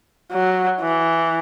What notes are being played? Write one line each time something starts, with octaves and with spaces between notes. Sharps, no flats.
F#3
E3